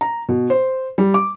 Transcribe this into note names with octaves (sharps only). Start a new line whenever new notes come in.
A#5
B2
C5
G3
D6